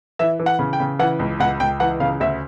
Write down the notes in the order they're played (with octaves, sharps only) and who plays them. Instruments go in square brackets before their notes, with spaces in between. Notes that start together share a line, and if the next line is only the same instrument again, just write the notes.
[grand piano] E3 E5
E3
F#5
C#3
G5
C#3
E3 F#5
C#2
C#2 F#5
C#2 G5
E3 F#5
C#3 F5
D2 E5